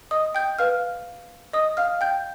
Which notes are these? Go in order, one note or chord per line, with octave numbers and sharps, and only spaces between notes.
D#5 D#6
G5 G6
B4 F5 F6
D#5 D#6
F5 F6
G5 G6